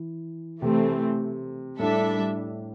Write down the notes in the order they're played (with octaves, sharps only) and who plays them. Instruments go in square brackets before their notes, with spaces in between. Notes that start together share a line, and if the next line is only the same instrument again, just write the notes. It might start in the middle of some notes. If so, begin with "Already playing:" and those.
Already playing: [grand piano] E3
[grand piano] C3 [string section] E3 A3 C4
[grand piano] A2 [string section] G3 D4 A4 E5